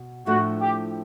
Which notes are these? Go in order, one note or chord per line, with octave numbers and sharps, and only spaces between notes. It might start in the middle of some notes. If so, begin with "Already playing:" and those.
Already playing: B2
A2 F3 A3 D4 F#4
G4